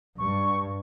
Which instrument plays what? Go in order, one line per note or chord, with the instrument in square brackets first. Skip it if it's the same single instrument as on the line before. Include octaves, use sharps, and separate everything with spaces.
[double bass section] G2 [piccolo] C#6